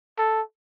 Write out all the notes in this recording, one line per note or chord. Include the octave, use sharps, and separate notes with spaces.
A4